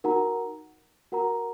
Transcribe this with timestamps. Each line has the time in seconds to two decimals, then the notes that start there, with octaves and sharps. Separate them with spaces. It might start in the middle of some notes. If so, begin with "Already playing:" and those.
0.04 D#4 F#4 A#4 F#5 A#5
1.12 F#4 A#4 F#5 A#5